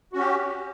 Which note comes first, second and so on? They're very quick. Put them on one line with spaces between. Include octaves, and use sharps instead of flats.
F#4 C#4 G4